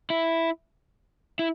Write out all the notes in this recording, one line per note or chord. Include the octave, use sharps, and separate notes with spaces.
E4
E4